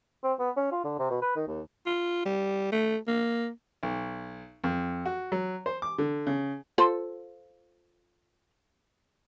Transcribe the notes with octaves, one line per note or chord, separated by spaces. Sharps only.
C4
B3
C#4
F4
D3
C3
B2
B4
D#3
D#2
F4
G3
A3
A#3
B1
F2
F#4
F#3
C5
D6
D3
C#3
F4 A4 C5